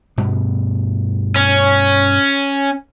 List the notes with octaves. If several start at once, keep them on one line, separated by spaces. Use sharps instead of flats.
G2 B2 B3
C#4